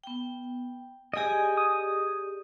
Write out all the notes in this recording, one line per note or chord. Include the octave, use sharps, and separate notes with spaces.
B3 G5
G4 G#4 D5 D#5 G#5
D#6